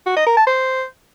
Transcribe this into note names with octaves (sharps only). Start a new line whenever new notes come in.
F#4
D#5
A#4
A5
C5